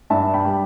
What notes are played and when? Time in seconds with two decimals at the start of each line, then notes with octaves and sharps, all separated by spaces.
0.10 G2 E5 A5
0.34 G5 B5
0.45 G3